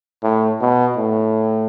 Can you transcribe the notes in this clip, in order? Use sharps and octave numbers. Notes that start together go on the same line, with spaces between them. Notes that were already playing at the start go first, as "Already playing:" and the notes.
A2
B2
A2